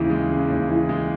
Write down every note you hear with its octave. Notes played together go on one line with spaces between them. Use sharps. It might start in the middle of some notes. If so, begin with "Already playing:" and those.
Already playing: D#2 C#3 E3
G#3
C#3
D#2
E3
G#3